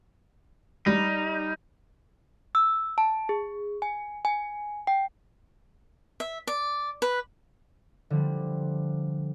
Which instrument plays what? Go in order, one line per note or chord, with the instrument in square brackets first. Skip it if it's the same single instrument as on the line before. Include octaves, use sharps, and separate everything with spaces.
[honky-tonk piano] G3 [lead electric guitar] D#4
[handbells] E6
A5
G#4
G#5
G#5
G5
[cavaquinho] E5
D5
B4
[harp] D3 F3 G3